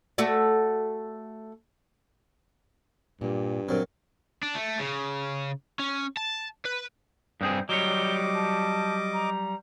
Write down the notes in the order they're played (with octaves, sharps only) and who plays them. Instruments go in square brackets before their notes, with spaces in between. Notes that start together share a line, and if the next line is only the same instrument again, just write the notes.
[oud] A3 F#4 D5
[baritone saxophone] G2 [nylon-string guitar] A#2 G3
[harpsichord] A#2 F#3 [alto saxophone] C4 [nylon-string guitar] D4 D5
[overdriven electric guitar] D4
A3
C#3
C#4
A5
B4
[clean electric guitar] G2 C4 G#4 [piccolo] D#6
[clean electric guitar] F#3 G3 C#5 [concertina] D#5 D6 [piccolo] G7
[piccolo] A5
A#5